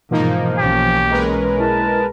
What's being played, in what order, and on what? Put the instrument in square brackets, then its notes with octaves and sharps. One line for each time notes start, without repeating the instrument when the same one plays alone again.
[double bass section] G#2 [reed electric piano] B2 E3 [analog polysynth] F3 A#3 D#4
[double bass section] B1 A#3 C#4 [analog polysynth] F3 [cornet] G4
[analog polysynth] G#3 A#4 B4
[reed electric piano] E4 [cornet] A5